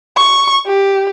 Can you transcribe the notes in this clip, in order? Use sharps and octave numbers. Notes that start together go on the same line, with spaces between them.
C#6
G4